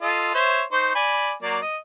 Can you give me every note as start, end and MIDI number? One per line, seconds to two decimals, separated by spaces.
0.02 0.32 65
0.02 0.32 69
0.02 0.32 75
0.34 0.62 72
0.34 0.62 73
0.34 0.62 76
0.72 0.92 63
0.72 0.92 72
0.72 0.92 85
0.95 1.33 74
0.95 1.33 80
0.95 1.33 83
1.42 1.58 54
1.42 1.58 58
1.42 1.58 74
1.62 1.77 75